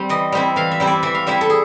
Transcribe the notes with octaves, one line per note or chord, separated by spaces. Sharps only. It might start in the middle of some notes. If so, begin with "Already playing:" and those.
Already playing: G3 C4
E3 D#5
G3 C4 E4
E3 F5
E5
G3 C4 E4
D5
E3 E5
F5
G3 C4 E4 E5
A4
G#4